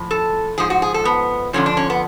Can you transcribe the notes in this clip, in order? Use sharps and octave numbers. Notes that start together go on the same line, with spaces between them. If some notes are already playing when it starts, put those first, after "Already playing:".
Already playing: A2 F3
A4
G#2 F3 G#4
F#4
G#4
A4
B3
F2 D3 F3 C#4
D4
C#4
B3